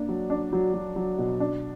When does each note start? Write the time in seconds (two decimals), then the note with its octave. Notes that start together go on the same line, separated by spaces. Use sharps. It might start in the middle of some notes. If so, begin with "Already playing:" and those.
Already playing: A#3 D4
0.09 F#3
0.30 D4
0.53 F#3
0.74 F#3
0.96 F#3
1.18 B2
1.40 D4